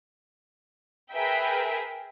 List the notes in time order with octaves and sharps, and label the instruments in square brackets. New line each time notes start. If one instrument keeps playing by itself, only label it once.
[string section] G#4 A#4 B4 E5 G5